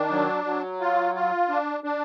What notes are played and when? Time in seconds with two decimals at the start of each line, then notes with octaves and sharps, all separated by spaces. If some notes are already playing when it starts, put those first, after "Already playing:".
Already playing: D#3 D4
0.10 F#3
0.45 F#3
0.81 F4
1.15 F4
1.49 D4
1.84 D4